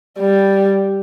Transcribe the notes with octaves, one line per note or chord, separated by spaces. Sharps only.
G3